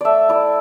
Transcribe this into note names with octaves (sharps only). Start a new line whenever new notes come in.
A3 D5 E5
E4 D5